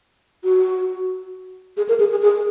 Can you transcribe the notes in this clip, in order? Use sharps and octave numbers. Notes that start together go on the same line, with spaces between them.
F#4
G#4
A#4
G#4
G#4
G#4